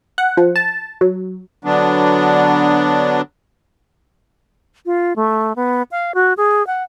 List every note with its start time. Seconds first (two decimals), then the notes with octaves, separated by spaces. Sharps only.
0.18 F#5
0.37 F3
0.56 A5
1.01 F#3
1.64 D3 F#3 B3 D4
4.86 F4
5.16 A3
5.56 B3
5.91 F5
6.14 F#4
6.37 G#4
6.67 F#5